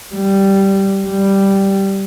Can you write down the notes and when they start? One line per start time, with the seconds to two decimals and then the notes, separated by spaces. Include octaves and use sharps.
0.15 G3
1.07 G3